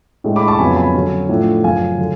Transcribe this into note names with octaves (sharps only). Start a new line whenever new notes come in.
A2 G#3 D4
B5 D6
A5 C#6
F2 C#3 F#3 B3 G#5 B5
A5
G#5 B5
D3 F#3 C#4
A2 F3 A3 D4
F#2 C#3 F3 F5 G#5
D3 F#3